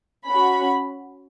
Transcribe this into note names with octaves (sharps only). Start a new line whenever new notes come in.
C#4 F#4 B5